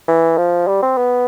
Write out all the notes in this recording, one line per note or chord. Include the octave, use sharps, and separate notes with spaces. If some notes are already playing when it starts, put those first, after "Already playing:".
E3
F3
G3
C4
B3